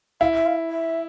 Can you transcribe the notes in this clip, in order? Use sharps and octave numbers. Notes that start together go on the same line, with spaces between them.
E4 F5
E5
F5
E5